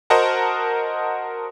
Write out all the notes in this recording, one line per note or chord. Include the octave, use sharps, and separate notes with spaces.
F#4 A#4 C5 D#5 F#5 A5